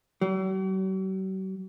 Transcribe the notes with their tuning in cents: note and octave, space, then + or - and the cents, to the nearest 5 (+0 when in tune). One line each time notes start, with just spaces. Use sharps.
F#3 +45